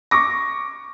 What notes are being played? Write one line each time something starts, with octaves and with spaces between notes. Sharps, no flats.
C#6 D6 A#6